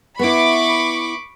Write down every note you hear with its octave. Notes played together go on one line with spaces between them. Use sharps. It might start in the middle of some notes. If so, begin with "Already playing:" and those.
B3 E4 B5 C#6 D6